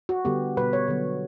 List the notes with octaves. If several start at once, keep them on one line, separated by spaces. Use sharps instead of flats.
F#4
D3 G3 B3 G4
B2 G3 B3 B4
C#5
D3 F#3 B3